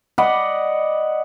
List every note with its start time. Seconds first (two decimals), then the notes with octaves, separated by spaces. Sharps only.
0.18 D5 D#5 F#5 B5